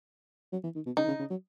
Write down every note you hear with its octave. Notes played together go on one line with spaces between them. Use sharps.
F#3
E3
D#3
B2
C#3 D#4
D#3
C#3
C#3
F#3